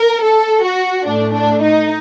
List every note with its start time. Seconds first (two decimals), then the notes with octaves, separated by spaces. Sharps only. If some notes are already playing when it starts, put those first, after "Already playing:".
Already playing: A#4
0.22 A4
0.65 F#4
1.06 A2 A3 D4
1.34 D4
1.62 D#4